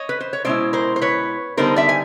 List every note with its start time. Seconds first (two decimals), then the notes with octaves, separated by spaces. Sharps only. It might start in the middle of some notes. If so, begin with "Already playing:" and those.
Already playing: C#5 D#5
0.09 B4
0.21 C5
0.33 C#5
0.45 B2 G#3 C#4 E4 C5 D5
0.73 A#4 C5
0.96 C5
1.01 B4 C#5
1.57 D3 G3 B3 D#4 A#4 C5
1.76 D5 E5
1.89 G#5